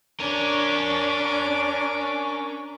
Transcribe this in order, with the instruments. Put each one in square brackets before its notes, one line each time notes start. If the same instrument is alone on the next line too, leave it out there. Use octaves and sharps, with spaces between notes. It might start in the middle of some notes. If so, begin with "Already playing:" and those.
[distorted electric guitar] C#4 [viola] D4 [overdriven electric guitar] A#4 C#5 [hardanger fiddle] D6